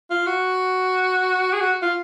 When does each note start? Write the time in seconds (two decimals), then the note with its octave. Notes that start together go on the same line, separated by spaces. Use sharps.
0.10 F4
0.27 F#4
1.53 G#4
1.60 F#4
1.82 F4